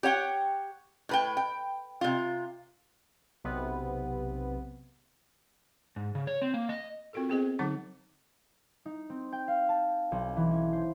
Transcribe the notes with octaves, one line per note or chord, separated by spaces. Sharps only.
G4 C#5 F#5 G5
A2 B4 G5
G5
C3 F4
B1 C3 B3
G#2
C#3
C#5
C4
A#3
D#5
C4 F4 F#4 A4 A#4
B3 C4 G#4 C5 D#5
D3 F#3 D#4 F#5 D6
D#4
C4
G5
F5
A5
B1
E3
C#4
C5